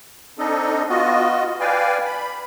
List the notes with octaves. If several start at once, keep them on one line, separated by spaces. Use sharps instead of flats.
C4 D4 D#4 A4 D#5
B3 F4 F#4 D#5
B4 D5 F5 G5 G#5
B5